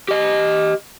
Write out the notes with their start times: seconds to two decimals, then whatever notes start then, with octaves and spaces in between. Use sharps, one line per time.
0.08 G4 D#5